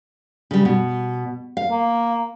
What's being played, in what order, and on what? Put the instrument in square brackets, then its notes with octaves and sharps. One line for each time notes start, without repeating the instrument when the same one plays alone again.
[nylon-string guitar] C#3 G3
B2
F5
[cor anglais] A#3